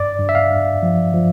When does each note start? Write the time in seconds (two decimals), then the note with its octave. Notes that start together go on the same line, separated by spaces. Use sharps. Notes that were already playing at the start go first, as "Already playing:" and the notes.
Already playing: G2 D5
0.19 G2
0.29 E5
0.35 F5
0.50 G2
0.83 F3
1.14 F3